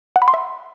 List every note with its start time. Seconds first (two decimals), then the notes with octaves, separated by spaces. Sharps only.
0.16 F#5
0.22 B5
0.28 C6
0.34 E5